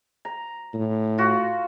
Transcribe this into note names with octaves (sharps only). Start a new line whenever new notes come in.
A#5
A2
F4 F#4